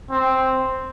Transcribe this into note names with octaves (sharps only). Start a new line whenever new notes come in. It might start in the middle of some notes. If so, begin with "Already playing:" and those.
C4